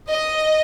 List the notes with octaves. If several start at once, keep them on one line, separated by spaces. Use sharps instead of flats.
D#5